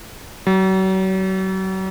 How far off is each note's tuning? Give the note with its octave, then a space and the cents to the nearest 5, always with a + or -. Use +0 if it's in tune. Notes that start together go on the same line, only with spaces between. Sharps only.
F#3 +40